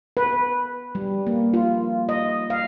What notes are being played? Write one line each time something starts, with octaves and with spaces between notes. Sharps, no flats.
B4
G3
A#3
F4
D#5
F5